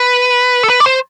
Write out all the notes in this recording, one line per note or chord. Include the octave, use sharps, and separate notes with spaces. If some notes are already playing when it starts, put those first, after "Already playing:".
Already playing: B4
A4
B4
D5
C5